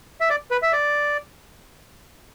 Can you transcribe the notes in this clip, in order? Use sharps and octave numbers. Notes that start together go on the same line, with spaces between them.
E5
D5
B4
E5
D5